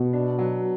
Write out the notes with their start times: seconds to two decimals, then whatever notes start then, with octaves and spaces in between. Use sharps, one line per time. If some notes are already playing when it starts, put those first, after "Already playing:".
Already playing: B2
0.13 D4
0.39 F#3